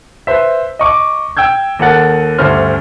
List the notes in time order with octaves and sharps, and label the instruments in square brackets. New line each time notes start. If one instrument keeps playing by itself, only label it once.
[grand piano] B4 C5 E5
D#5 C#6 D6
G5 E6 G6 G#6
D#2 A4 A#4 F#5 A6
D2 G2 A3 C#4 C5 F6